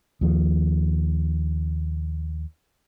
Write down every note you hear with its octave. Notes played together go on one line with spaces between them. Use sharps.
D#2 F3